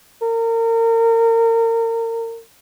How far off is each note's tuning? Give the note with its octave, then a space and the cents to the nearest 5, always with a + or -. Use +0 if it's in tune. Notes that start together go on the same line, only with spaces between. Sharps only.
A#4 -30